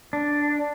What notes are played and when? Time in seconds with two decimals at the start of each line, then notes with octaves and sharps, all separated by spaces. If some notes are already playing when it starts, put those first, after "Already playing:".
0.13 D4